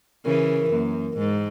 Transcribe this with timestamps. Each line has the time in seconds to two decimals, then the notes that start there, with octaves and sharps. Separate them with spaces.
0.25 C#3 E3 A#4
0.48 A#4
0.72 F#2 A#3
0.94 A#4
1.18 G#2 G#3